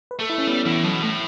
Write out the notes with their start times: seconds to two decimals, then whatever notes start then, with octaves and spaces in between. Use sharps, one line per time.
0.11 B4
0.19 A3 A4
0.30 E4
0.38 C#4
0.47 G3 B3
0.66 B2 E3
0.72 A2
0.84 B2 F#3
1.02 A2 A3